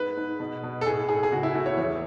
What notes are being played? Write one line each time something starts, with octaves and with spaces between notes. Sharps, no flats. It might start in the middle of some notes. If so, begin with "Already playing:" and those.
Already playing: G#2 B4
G#2
B2
B2
A4
A2 G#4
A2 G#4
G#4
C#2 F#4
E4
A3 F#4
C#5
E2 C#5